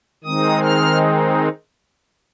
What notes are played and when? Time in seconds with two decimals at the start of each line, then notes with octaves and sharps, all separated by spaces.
0.24 D#3 G#3 C4 D#4 D#6
0.63 F6